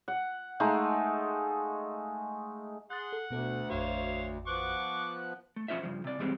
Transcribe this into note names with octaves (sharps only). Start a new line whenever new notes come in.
F#5
G#3 A3 D#4 F5
G#4 F#5 C6 F#6 A6
A4
D2 B2 B3 A4
A1 F2 F#4 C5 C#5 F5
F3 B3 C#6 D6 F#6
A3
F2 C#4 F4 C5 E5
G2 C#3 F3
C3 D5
E2 G#2 G3 G#3 C4